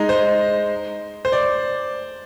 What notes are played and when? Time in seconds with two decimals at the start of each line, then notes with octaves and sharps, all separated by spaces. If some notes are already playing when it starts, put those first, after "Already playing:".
Already playing: G#3 D#4
0.09 C5
1.25 C5
1.32 D5